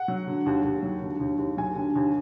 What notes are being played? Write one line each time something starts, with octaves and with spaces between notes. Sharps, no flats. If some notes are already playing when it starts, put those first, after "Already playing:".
Already playing: F#5
F#3
D3
D#2
D#2
F#3
D3
D#2
D#2
F#3 G#5
D3
D#2